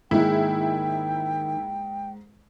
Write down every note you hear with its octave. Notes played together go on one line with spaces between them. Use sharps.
G#2 D#3 G#3 A#3 E4 G5